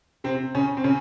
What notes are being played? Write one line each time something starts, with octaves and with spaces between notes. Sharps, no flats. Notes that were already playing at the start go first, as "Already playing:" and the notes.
C3 C4
C#3 C#4
C4
C#3 C#4